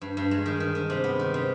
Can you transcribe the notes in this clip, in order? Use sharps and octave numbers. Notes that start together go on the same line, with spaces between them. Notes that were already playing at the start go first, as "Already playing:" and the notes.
G2
G2
G#3
D#3
D#3
D#3
C3
B3
D#3
C3